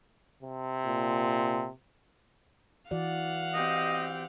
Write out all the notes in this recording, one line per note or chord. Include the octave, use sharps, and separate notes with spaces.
C3
A#2
E3 F#4 D5 F5 F#5
C4 G4 D#5